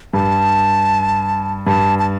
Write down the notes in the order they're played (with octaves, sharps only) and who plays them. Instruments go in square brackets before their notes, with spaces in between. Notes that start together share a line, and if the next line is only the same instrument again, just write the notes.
[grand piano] G2 [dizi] A5
[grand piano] G2 [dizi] A5
[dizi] A5